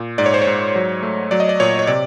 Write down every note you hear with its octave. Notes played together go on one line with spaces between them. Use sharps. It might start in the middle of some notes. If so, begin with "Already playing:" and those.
Already playing: A#2
G#2 D5
C#5
C5
C#5
G#2
F#3
A3
F#3 D5
D#5
D5
A#2 C#5
C#5
C3 D5